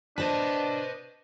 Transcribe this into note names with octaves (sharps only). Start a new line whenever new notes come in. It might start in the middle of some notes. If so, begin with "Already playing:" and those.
D4 B4 C5 D#5 A5